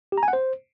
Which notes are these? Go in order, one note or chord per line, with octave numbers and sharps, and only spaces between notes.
G4
A#5
G#5
F#5
C5